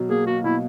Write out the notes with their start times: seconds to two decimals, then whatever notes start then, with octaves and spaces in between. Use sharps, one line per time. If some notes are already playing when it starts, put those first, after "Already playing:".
Already playing: B2 F#3
0.09 A#3 G#4
0.27 A#3 F#4
0.44 B2 E4